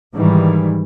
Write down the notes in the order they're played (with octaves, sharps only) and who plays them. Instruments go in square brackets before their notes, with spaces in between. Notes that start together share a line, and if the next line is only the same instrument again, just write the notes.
[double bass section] G#2 D#3 E3 G3